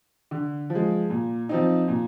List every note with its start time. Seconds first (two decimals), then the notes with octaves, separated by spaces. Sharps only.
0.31 D3
0.70 F3
0.75 G#3
1.10 A#2
1.49 F3 C4 D#4
1.88 A#2